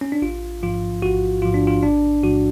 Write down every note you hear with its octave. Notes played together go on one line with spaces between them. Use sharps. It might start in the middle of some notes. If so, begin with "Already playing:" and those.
C#4
D4
A1 F4
G#2 F3 F4
A1 F#4
G#2 F3 F4
D4
F4
A1 D4
G#2 F3 F#4